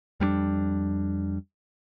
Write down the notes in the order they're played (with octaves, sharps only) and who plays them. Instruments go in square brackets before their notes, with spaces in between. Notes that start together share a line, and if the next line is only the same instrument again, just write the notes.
[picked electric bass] F2 G3 A#3 D4